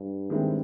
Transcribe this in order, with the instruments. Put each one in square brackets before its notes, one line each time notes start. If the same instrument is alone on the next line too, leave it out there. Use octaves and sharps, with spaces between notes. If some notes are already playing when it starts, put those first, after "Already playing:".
Already playing: [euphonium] G2
[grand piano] D#3 G#3 C4 E4